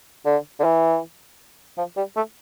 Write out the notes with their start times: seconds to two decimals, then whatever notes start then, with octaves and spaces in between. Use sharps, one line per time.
0.26 D3
0.60 D3
0.64 E3
1.78 F3
1.97 G3
2.16 A3